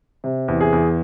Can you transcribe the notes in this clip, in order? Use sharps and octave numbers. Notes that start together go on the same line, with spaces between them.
C3
E2
G#4
E2